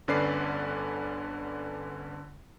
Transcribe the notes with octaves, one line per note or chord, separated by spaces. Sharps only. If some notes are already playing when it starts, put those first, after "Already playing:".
G1 D3 C#4 B4 D5 C7